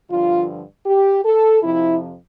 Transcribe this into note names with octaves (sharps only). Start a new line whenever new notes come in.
G2 D3 F3 F4
G4
A4
F2 C3 F3 E4